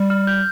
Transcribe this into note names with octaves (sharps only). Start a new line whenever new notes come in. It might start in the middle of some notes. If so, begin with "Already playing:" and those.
Already playing: G3
F6
G6